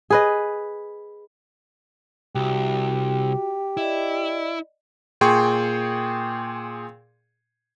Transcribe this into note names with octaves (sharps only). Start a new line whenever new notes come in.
G#4 B4 D#5
C2 F#4 G4
E4 D5 D#5
A#2 G#4 G5 C6 C#6